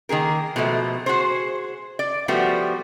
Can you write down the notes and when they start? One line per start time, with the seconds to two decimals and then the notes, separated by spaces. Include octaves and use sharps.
0.09 D#3 A#3 G#4 A#4
0.56 B2 F3 G#3 A3
1.06 F#4 G#4 C5
1.99 D5
2.28 F3 G3 A3 B3 F#4